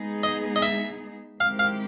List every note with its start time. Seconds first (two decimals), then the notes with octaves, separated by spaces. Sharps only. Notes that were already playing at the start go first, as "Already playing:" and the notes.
Already playing: G#3 B3 D#4 G#4
0.23 D#5
0.56 D#5
0.62 E5
1.40 D#3 G#3 C4 E4 G4 F5
1.59 F5